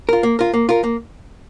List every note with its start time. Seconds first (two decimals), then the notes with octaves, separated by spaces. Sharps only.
0.09 F4 A#4
0.23 A#3
0.39 F4 A#4
0.54 A#3
0.69 F4 A#4
0.84 A#3